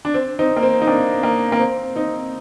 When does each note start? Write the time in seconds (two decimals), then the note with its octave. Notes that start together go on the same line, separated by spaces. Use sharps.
0.05 D4
0.14 C4
0.39 C4 D#4
0.57 A#3
0.63 C4
0.82 D#4
0.87 A#3 D4
1.23 A#3
1.52 A#3
1.59 C4
1.96 C4 D#4